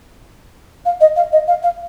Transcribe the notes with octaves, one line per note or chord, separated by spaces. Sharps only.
F5
D#5
F5
D#5
F5
F5